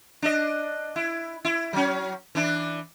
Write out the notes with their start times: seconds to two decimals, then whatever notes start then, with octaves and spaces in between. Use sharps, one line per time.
0.22 D4 D#5
0.96 E4
1.45 E4
1.73 F#3 C#4
2.35 E3 D4 E4